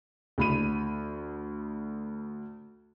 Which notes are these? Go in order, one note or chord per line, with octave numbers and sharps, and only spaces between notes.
D2 B5 D#7